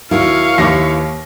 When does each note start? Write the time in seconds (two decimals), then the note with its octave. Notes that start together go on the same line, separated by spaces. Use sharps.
0.11 D#2 F#3 E4 A#4 C#5 F5 C#6
0.58 D#2 E4 B4 D6 A#6